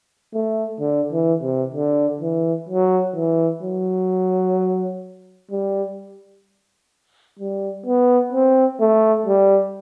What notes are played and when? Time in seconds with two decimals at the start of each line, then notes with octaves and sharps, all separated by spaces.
0.34 A3
0.80 D3
1.12 E3
1.43 C3
1.74 D3
2.21 E3
2.69 F#3
3.16 E3
3.63 F#3
5.51 G3
7.39 G3
7.86 B3
8.33 C4
8.81 A3
9.26 G3